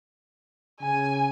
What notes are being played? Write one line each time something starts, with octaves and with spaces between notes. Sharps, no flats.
C#3 G#5